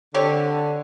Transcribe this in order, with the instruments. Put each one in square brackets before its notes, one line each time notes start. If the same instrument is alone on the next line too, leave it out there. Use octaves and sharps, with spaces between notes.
[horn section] D3 [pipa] C4 G4 C#5